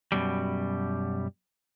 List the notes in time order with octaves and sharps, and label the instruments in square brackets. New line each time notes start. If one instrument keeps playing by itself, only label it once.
[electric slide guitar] F#2 B2 G3